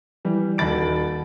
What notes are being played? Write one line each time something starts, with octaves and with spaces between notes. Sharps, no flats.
E3 G3
D#1 D#2 F#4 B5 A6 D7